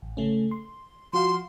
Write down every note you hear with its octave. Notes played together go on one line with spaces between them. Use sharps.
A1
C#3 A3 C#4
C6
F3 F#4 F5 C6